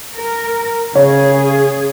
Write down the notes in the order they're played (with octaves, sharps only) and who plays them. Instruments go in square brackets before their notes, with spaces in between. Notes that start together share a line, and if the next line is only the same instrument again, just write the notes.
[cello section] A#4
[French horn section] C#3 [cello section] G#4 [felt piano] C#5